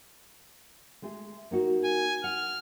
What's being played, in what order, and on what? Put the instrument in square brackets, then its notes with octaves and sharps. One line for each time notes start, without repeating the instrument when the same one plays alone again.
[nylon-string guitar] G#3 A3 G#4
A#3 D#4 F#4
[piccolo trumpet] G#5
[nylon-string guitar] F#5 [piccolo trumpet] F6